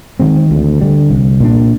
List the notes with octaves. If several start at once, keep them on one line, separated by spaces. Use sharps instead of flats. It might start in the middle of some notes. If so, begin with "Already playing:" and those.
D#3 G#3 C4
D2
D3 G3
C2
A#2 G3 D4